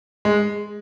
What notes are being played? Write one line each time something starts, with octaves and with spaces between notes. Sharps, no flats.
G#3